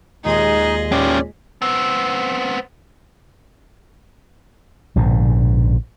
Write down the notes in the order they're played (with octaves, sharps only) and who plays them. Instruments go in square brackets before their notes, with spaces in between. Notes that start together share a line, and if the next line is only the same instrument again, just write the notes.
[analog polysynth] D#2 A#2 G#3 [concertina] D#4 [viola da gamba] G#4 D#5
[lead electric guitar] C#4 G4 [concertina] D5
[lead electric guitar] B3 C4
[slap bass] A#1 G#2 B2 D3